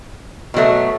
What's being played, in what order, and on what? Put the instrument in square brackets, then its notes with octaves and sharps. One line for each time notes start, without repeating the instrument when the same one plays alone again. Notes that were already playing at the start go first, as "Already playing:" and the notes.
[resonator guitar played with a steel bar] B2 F#3 A3